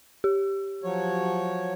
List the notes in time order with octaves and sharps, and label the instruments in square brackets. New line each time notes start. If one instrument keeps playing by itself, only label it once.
[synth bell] G4
[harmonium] F3 F#3 C#5